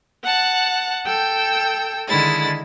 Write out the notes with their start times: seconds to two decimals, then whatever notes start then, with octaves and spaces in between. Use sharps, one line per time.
0.23 F#5 A5 F#6
1.05 A4 G5 E6 G6
2.08 D3 D#3 G#3 E4 A6